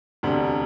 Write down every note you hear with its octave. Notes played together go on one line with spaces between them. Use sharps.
E1 D2 C3